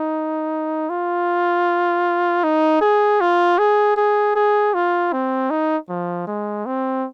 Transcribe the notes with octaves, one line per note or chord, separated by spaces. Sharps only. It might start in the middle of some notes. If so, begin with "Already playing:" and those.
Already playing: D#4
F4
D#4
G#4
F4
G#4
G#4
G#4
F4
C4
D#4
F3
G#3
C4